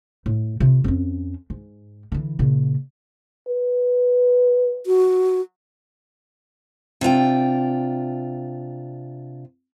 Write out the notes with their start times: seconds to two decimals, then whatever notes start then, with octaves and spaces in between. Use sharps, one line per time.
0.26 A2
0.60 C3 F4
0.84 F2 C#4
1.50 G#2
2.12 D3 E3
2.39 A#2 C#3
3.48 B4
4.86 F#4
7.01 C3 D4 F4 G5